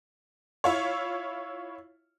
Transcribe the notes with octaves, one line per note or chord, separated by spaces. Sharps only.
E4 F4 C#5